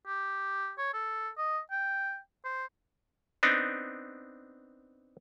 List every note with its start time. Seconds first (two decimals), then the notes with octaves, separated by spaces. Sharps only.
0.07 G4
0.78 C#5
0.94 A4
1.38 D#5
1.71 G5
2.45 C5
3.43 B3 C4 D4 D#4